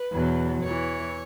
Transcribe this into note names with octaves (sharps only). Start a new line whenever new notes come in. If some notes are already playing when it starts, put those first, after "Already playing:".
Already playing: B4
E2 B2 F#3
E2 E3 C#5